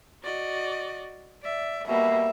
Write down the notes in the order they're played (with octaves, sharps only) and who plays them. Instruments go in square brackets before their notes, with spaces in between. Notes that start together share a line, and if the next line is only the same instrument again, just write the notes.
[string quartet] F#4 D5 D#5
D5 E5
[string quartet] B2 G3 A#3 [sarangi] E5